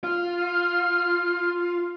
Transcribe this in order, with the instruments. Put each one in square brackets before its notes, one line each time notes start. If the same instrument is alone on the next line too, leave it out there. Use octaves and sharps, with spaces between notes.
[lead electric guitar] F4 [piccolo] F6